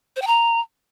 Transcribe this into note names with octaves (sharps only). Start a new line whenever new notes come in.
C5
G5
A#5